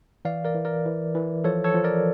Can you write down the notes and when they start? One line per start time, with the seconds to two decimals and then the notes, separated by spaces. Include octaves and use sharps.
0.25 E3 D5 F5
0.45 A#4 D5
0.55 E3
0.65 A#4 D5
0.85 E3
1.15 E3
1.44 F3 A4 C#5
1.64 A4 C#5
1.75 F3
1.84 A#4 D5